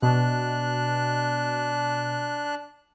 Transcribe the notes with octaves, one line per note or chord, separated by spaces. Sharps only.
B2 D4 F#6